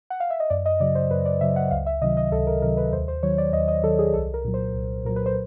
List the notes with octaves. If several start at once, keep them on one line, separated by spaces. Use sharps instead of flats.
F#5
F5
E5
D#5
F#2 D5
D#5
C#3 F#3 D5
C5
F#2 B4
D5
C#3 F#3 E5
F#5
C#2 F5
E5
C3 D#3 F#3 D#5
D#5
C#2 A4
A#4
C3 D#3 F#3 A#4
B4
D#2 C5
C5
D#3 F#3 C#5
D5
D#2 D#5
D#5
D#3 F#3 A4
G#4
C2 A4
A#4
A#2 F#3
C5
C2
A#2 F#3 A#4
B4
C5